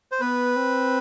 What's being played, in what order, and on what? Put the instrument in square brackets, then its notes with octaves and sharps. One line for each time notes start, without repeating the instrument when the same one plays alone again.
[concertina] C5
[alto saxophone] B3 [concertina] B4
[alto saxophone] C4